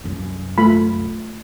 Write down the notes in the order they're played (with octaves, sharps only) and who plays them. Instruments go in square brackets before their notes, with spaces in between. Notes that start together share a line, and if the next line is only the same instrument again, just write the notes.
[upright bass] C2 F#2
[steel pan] A3 F4 B5